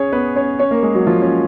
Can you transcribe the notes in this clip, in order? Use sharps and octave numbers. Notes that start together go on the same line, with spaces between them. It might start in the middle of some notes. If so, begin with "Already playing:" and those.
Already playing: C#4 G#4 C#5 G#5
B3 B4
C#4 C#5
C#4 C#5
A#3 A#4
G#3 G#4
F#3 F#4
F3 F4
C#4